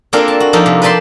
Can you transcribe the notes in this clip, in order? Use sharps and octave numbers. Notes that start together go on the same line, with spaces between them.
A#3 C4 D4 F4 A4 F5
A5
F#4
F3 A#3 D#4 F4 A4
C3
B4 D5 G5 A5 B5 C6